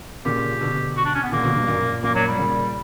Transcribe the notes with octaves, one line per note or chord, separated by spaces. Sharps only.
A#2 C#3 G4
B2 D3
F#4
D4
C#4
B3
A#2 C#3 A#3
B2 D3
G2 B2
F#2 A#2
F#2 A#2 A#3
F#3
G3
A#2 C#3